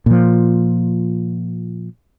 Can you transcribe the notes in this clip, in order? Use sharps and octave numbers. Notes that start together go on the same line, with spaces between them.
A#2 F3